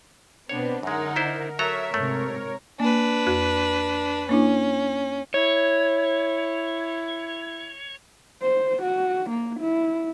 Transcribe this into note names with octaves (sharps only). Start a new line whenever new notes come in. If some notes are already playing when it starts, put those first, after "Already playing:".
B2 B3 C4 D4 C#5
F#2 D3 G#3 D#4 A#4 F#5
D4 E4 C5
F#3 A4 A#4 C#5 E5 A#5
G#2 C3 A3
A#3 D4 B4
F2 F#4 F#6
A#3 C#4 D4 E4
E4 C#5
C5
F#4
A#3
E4